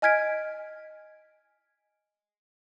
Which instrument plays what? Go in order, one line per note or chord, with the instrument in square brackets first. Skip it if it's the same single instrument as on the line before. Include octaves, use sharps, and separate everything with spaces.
[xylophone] D#5 G#5 F6 G#6 B6 D7